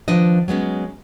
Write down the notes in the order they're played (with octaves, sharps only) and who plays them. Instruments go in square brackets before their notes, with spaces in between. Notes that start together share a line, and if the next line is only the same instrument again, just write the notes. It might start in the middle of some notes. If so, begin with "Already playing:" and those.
[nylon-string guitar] D#3 F3 D4 B4 D#5
F#3 G#3 B3 C#4